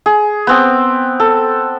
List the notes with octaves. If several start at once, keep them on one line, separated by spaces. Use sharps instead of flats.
G#4
B3 C4 G5
A4